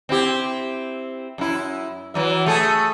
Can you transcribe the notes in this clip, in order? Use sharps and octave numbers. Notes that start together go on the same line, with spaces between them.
C4 E4 G4
F#2 E4
E3 F#3 E5
A3 G#4 A4